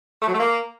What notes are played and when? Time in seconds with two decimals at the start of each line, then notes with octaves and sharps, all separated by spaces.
0.21 A3
0.27 F#3
0.33 A3
0.39 A#3